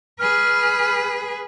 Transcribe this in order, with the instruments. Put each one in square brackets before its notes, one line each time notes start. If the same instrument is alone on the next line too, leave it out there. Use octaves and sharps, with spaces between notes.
[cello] G#4 B4 [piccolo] F6